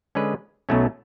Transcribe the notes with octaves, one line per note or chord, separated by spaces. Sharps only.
D3 G#3 C#4 G#4 B4
B1 B2 F#3 A3 C#4